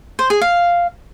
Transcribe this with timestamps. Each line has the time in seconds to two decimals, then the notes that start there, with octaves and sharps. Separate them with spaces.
0.19 C5
0.30 G#4
0.41 F5